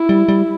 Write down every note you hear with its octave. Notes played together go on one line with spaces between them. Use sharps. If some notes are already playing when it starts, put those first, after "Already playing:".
Already playing: E4
G3
G3